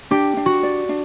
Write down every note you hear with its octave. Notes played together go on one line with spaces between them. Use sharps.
D4 G4
D4
F#4
D5
D4